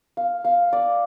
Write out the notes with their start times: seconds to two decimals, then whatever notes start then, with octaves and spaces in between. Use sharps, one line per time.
0.17 F5
0.45 F5
0.73 D5